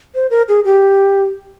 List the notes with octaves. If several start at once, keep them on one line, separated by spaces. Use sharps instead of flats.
C5
A#4
G#4
G4